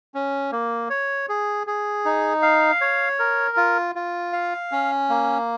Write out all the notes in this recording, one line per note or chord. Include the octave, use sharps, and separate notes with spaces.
C#4
A#3
C#5
G#4
G#4
D#4
F5
C#5
A#4
F4
F4
F5
C#4
A#3